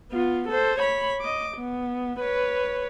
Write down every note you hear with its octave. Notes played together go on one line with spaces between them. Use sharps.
B3 F4
A4 C5
C#5 B5
D#5 D6
B3
B4 C#5